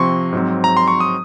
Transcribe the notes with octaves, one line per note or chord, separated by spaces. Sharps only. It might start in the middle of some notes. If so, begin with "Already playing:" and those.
Already playing: C3 F3 C4 C6 C#6
G#2 F#3 C4
A#5
C6
C#6
D#6